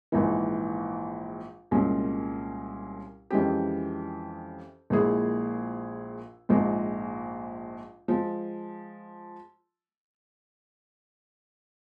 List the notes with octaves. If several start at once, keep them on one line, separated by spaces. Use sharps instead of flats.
A#1 G#2 E3
C2 A#2 G#3 C#4
F2 E3 G#3 C#4 G4
A#1 A#2 G#3 E4 G#4
A#1 G#2 F3 G#3
F3 G#3